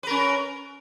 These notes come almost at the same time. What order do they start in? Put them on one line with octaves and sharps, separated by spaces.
B4 A#4 C#4